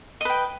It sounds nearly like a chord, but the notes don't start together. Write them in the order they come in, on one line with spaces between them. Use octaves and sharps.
D#5 B4 G5